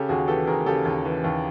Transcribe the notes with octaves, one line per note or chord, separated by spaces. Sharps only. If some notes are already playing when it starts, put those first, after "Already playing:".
Already playing: C#3 G4 A4
D#2 F#4 G#4
E3 G4 A4
D#2 G#4 A#4
C#3 G4 A4
D#2
E3
D#2